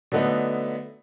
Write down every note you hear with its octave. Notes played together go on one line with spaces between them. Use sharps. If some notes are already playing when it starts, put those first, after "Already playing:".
D3 F#3 A3 B3 D#4